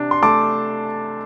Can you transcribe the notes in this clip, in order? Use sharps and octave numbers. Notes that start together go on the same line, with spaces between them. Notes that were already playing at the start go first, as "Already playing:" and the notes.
Already playing: C3 D4
C6
A3 A5 D6